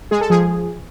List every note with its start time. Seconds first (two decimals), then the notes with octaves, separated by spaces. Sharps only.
0.11 G#3 G#4
0.21 A4
0.30 F3 G#4